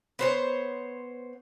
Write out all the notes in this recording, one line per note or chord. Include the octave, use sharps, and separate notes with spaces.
B3 C5 C#5